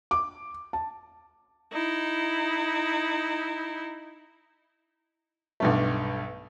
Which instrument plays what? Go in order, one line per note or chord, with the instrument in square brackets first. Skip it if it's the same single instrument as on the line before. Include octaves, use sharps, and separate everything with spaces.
[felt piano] D6
A5
[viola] D#4 E4
[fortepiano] B1 G2 A3